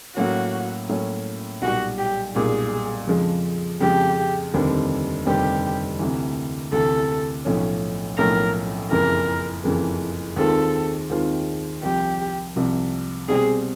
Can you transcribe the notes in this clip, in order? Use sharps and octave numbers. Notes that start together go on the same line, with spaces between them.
A2 F#3 A#3 C#4 F#4
A2 F#3 A#3 C#4
B1 A#2 G3 F#4
G4
B1 A#2 G3 G#4
F2 C#3 F3 G#3
F2 C#3 F3 G#3 G4
F1 D#2 D3 G3 C4
F1 D#2 D3 G3 C4 G4
D2 C3 E3
D2 C3 E3 A4
B1 A2 F3 A3 C#4
B1 A2 F3 A3 C#4 A#4
F#1 F2 C#3 E3 A#4
F#1 F2 C#3 E3
D#2 D#3 G#3 C4 F4 A4
D#2 D#3 G#3 C4 F4
C2 C3 F3 G4
C2 C3 F3
B2 G3 C4 G#4